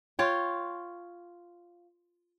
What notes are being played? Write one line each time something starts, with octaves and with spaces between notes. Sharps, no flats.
F4 C#5 G5